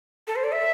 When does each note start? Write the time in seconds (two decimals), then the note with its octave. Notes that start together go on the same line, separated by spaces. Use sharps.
0.27 A4
0.36 C5
0.44 D5
0.52 E5